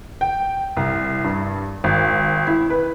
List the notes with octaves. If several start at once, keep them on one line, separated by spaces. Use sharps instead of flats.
G5
C2
G2
G#1
E4
B4